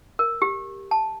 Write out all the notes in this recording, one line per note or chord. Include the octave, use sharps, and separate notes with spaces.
A#4
G4
A5